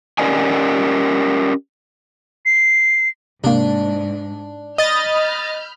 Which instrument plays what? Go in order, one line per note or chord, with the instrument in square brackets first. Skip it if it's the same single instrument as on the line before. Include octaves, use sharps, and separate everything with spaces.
[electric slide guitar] C#4 G4 A#4 D5 D#5 G#5
[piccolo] C7
[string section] G#2 [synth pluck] C3 A#3 [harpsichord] D4
[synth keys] D#5 A6 [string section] B5 F6 G6